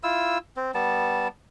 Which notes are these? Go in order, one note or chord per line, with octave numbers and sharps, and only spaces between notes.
E4 F4 E6
C4
G3 B3 A5